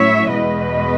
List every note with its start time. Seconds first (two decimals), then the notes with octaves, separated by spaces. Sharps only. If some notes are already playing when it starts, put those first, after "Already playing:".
Already playing: A2 F#3 C#4 E4 C#5 E5
0.32 E2 B2 G#3 B4 D#5